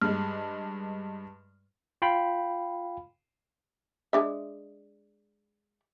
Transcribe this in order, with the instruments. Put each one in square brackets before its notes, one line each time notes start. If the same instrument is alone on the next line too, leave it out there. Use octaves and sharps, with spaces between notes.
[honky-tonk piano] G2 G#3 [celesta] F6
[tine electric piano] F4 F5 G5 B5
[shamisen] G#3 D4 E5